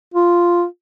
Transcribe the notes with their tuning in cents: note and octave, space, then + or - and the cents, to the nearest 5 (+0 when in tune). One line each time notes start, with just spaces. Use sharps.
F4 -5